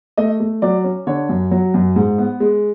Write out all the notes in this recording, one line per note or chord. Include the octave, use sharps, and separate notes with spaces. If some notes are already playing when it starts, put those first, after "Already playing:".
A3 D#5
A3
F#3 D5
C#4
D3 C#5
F#2
F#3
F#2
G#2
B3
G#3